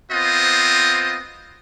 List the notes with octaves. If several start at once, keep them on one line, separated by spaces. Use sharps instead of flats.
B3 C4 F4 C5 D#5